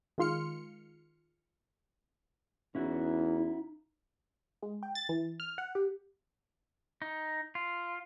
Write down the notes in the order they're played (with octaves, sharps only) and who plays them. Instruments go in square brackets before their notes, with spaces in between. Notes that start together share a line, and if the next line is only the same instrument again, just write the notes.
[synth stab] D#3 G#3 F4 C6 F6 C#7
[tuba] E2 [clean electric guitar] C#4 E4 F#4 [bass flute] D#4
[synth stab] G#3
G5
A6
E3
F6
F#5
G4
[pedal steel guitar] D#4
F4